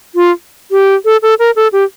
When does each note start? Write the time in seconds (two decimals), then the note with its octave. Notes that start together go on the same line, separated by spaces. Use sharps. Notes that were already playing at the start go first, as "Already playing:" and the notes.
0.15 F4
0.71 G4
1.05 A4
1.22 A4
1.39 A#4
1.56 A4
1.72 G4